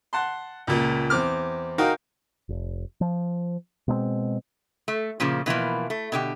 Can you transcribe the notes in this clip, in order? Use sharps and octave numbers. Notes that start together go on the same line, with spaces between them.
F#5 A5 C6
C#2 A#2
E2 C4 D6 F6
D#4 F#4 A#4 F5 G5
F1
F3
B2 G#3 A3 C4
A3
A#2 C#3 F3 A#3
B2 E3 F3 A#3
A3
B2 D3 G4